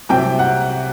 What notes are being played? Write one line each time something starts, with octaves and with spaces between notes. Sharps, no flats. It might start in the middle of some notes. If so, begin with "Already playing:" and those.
C2 C3 F#3 C4 G5
F#5